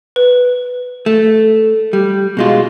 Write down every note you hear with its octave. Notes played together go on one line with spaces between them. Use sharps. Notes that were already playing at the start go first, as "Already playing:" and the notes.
B4
A3
G3
B2 G#3 F4